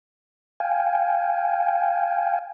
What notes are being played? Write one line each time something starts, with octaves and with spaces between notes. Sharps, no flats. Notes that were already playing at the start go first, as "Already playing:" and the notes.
F5 G5 G#5